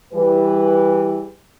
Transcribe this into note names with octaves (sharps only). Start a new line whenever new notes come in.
E3 G3 G#4 B4